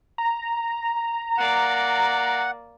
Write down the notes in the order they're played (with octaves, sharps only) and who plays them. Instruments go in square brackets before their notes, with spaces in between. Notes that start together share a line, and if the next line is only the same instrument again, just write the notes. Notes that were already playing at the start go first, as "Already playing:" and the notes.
[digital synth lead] A#5
[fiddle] A#3 D5 [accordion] F#5